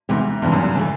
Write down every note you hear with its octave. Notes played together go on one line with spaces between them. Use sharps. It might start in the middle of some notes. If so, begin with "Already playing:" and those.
E2 G#2 C3 E3
E2 G2 C3 E3
F#2
F#2
C#3 E3 A3